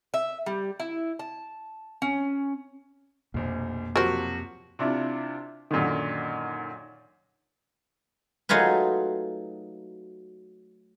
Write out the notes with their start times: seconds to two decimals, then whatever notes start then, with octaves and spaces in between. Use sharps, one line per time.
0.14 E5
0.46 G3
0.80 E4
1.19 A5
2.02 C#4
3.34 F1 A#1 F2 B2 A#3
3.96 C3 F3 F#3 F#4 A#4 C5
4.79 C3 D4 E4 F4
5.71 F#2 A#2 D3 D#3
8.49 F#3 A3 D#4 F4 G#4 B4